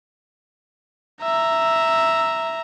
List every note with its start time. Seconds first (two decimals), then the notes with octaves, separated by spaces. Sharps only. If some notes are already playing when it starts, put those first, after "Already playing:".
1.23 E5 A#5